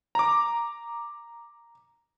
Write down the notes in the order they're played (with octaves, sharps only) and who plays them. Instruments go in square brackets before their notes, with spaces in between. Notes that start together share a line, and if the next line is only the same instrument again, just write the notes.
[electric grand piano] A#5 D6